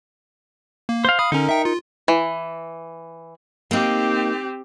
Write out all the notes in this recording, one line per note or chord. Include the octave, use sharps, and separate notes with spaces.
A#3
C5 F5
F5 B5 D#6
D3 C#4 D#4 A#4
E5 G5
F4
E3
A#3 C4 D#4 G4